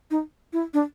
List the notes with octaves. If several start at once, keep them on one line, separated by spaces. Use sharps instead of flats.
D#4
E4
D4